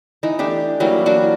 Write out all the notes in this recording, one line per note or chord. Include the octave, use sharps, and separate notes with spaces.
E3 D#4
A3 D4 G4
E3 F#3 G3 A#3
A#3 D4 F#4